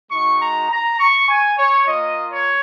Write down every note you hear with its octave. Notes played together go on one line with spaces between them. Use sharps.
G#3 D#4 F#4 C#6
A#5
A#5
C#6
G#5
C#5
A#3 F4 D#5
C#5